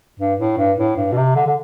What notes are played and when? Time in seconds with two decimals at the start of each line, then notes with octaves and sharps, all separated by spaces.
0.20 G2
0.40 A2
0.58 G2
0.78 A2
0.97 G2
1.12 B2
1.17 C3
1.36 D3
1.46 D3